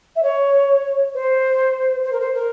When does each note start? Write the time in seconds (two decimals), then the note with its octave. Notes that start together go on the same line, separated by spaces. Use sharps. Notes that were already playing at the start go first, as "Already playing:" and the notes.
0.15 E5
0.22 C#5
1.13 C5
2.03 C5
2.12 A#4
2.20 C5
2.34 A#4